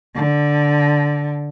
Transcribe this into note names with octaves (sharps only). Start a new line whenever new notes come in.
D3